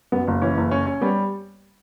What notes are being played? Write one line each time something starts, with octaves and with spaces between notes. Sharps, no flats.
F#2 B3
F#1
E3 C#4
F#1
C#4
C#4
G3 B3